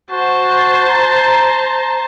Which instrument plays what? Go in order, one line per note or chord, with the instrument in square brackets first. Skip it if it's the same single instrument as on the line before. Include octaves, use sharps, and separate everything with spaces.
[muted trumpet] F#4 [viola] C5 A5
[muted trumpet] A#5